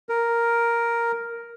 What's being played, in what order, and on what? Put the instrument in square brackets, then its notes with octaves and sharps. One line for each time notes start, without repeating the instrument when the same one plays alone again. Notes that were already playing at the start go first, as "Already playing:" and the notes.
[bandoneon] A#4